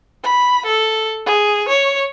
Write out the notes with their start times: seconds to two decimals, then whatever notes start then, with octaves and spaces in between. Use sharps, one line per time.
0.24 B5
0.66 A4
1.26 G#4
1.68 C#5